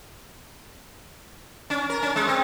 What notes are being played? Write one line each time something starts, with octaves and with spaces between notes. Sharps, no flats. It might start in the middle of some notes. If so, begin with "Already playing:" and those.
C#4
A#4
C#4
G#3
C4